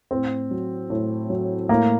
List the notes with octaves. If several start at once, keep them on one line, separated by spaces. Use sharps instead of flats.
A2 C4
F#3
A2
F#3
A2 A#3